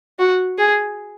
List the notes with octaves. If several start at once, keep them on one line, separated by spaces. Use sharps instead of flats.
F#4
G#4